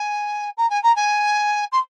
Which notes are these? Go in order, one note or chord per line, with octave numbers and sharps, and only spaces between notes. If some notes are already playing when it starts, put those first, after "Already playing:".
Already playing: G#5
A#5
G#5
A#5
G#5
C6